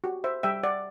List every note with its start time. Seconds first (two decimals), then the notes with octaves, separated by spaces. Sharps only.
0.04 F#4 G4
0.24 C5 E5
0.43 G3 E5 G5
0.64 D5 F#5